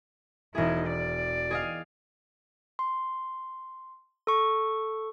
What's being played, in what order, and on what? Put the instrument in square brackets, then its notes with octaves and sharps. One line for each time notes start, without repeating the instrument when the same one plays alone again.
[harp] E1 G#4 [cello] D#4 E4
[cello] D5
[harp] G#4 D#5 F5
[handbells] C6
A4 C#6